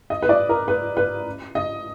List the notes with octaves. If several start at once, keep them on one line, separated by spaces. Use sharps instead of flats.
D#5
B4
D5
A#4
B4
B4
D#5